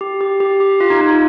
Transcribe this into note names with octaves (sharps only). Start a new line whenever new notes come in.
G4
G4
G4
G4
F4
D#4
D#4
F4